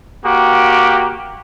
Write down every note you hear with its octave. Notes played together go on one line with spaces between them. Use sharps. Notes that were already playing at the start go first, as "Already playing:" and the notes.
A#3 F#4 G4